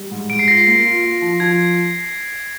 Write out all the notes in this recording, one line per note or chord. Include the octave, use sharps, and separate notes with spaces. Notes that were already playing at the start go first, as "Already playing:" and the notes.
Already playing: G3
G#2
G#2 D7
C7
F4 A#6
C7
A#3 A#6
F4
F4
F3
F3 G#6